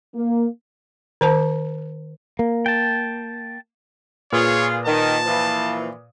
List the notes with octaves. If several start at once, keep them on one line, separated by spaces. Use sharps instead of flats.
A#3
D#3 C5 A5
A#3
G5 A5
A#2 F4 G#4 B4 C#5 D#6
D#3 A5
E3 F3